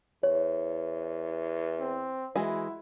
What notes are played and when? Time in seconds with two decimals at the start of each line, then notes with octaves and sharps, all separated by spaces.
0.23 E2 C#5
1.80 C4
2.36 E3 G#3 E4 F#4